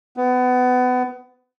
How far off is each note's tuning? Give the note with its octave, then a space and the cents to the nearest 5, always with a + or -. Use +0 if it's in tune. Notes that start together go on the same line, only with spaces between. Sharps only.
B3 +25